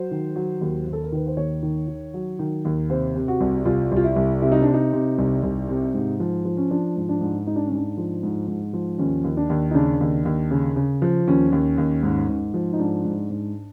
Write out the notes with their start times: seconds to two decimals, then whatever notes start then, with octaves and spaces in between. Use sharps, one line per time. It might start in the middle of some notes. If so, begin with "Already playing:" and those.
Already playing: F#3 C5
0.11 D#3
0.36 F#3
0.61 D#2
0.87 D#2
0.93 A4
1.03 A#4
1.12 D#3 B4
1.27 C5
1.37 D#2 C#5
1.62 D#3
1.88 D#3
2.14 F#3
2.39 D#3
2.65 D#2
2.90 C3 C5
3.16 C3
3.28 F#4
3.40 C2
3.65 C2 F4
3.92 C2 F4
4.04 E4
4.16 C2
4.42 C3 E4
4.52 D#4
4.62 C3 D4
4.74 D#4
4.93 C3
5.18 C2
5.43 C2
5.69 C3
5.94 G#2
6.20 F3
6.45 F3
6.57 C#4
6.70 F3 D4
6.96 G#2
7.09 D4
7.21 G#2
7.47 G#2 D#4
7.56 D4
7.66 C#4
7.71 G#2 D4
7.97 F3
8.23 G#2
8.48 G#2
8.73 F3
8.98 D#2 C#4
9.24 D#2
9.37 D4
9.50 D#2
9.71 D#4
9.74 C#3 D4
10.00 D#2
10.25 D#2
10.51 C#3
10.76 C#3
11.02 F3
11.27 D#2 C#4
11.52 D#2
11.78 D#2
12.03 G#2
12.29 G#2
12.54 F3
12.73 D#4
12.79 G#2 D4
13.05 G#2
13.30 G#2